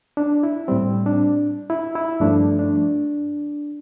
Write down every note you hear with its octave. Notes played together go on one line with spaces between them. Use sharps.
D4
E4
A2 G3 C4
D4
E4
E4
G2 F3 A3 D4
D4